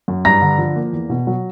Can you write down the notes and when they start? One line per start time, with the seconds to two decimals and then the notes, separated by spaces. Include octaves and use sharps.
0.08 F#2
0.25 G2 A#5 A#6
0.42 D3
0.58 F3
0.76 A#3
0.93 E2
1.10 B2
1.27 F#3